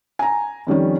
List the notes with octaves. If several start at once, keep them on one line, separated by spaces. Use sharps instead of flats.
G#5 A#5
F2 D#3 G3 C#4